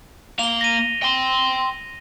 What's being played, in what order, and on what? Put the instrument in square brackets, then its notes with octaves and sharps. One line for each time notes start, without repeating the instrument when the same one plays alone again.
[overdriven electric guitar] A#3 F5 [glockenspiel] F7 G7
[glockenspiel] A#6 D#7
[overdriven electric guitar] G5 C6